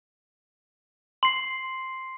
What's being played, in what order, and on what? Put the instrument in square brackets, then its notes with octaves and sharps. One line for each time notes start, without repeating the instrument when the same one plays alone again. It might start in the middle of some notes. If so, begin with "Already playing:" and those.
[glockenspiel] C6 C7